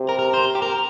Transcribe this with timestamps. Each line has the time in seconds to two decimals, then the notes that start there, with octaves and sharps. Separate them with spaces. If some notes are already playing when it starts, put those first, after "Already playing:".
Already playing: C3
0.09 A#4
0.19 A#4
0.34 C5
0.55 G4
0.62 A#4